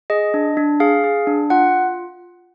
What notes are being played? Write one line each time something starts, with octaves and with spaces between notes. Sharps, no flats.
G#4 D#5
D4
D4
G#4 F5
G#4
D4
F4 F#5